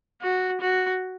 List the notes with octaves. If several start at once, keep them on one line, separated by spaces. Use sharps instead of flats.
F#4
F#4